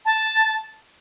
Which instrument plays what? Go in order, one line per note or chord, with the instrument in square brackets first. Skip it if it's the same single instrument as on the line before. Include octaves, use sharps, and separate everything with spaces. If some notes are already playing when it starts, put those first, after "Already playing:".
[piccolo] A5